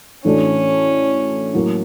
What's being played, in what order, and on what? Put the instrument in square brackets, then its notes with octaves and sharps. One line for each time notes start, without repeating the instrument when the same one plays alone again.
[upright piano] A2 E3 A3 D4 F#4 [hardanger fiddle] C#4
[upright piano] A2 F#3 A#3